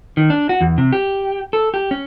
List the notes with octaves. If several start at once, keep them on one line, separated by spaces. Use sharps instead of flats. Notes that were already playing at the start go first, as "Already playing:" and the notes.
D#3
D4
F#4
E2
C3
G4
A4
G4
C#4